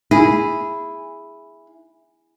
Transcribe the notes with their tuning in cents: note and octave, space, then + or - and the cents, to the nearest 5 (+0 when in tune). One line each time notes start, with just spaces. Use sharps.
E4 +0 G#4 -10